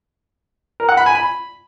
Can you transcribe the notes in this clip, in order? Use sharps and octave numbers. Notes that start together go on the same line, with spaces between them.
A#4
F#5
B5
G#5
B5